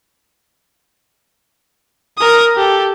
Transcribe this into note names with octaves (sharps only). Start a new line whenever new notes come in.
A#4 D#6
G4 A4